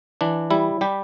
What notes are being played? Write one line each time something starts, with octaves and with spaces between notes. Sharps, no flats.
E3 D4
G3 E4
G3 G4